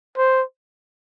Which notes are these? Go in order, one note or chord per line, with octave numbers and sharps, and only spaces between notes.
C5